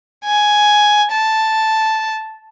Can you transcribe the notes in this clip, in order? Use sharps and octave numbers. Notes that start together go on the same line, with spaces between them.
G#5
A5